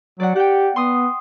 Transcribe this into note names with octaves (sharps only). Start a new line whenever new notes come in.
F#3 D5 F#5
G4 F#5 G5
B3 C6 D#6